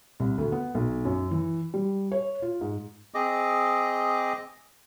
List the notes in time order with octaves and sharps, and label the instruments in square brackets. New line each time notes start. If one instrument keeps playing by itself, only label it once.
[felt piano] C2
D2
B3
B1
F#2
E3
G3
C#5
F4
G#2
[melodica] C4 G#4 D#5 D6